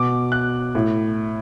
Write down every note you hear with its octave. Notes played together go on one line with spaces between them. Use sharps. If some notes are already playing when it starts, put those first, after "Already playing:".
Already playing: B2 D6
F#6
A2